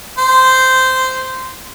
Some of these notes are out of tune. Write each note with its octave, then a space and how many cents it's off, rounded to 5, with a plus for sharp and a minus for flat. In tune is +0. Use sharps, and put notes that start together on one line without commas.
C5 -10